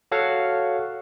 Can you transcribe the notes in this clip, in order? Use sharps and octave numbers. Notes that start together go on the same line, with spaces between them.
F#4 A4 C#5 F5 F#5